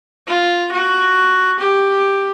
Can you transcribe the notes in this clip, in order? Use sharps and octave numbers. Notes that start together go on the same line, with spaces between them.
F4
F#4
G4